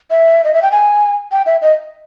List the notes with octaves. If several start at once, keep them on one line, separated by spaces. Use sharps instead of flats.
E5
D#5
E5
G5
G#5
G5
E5
D#5